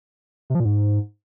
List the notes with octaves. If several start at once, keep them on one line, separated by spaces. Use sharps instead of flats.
C3
F3
A#2
G#2